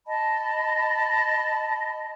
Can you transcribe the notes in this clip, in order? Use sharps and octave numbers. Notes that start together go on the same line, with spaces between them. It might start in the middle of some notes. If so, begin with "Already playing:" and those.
D#5 A5 B5